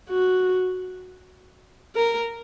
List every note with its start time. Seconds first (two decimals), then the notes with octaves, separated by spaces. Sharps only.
0.09 F#4
1.96 A#4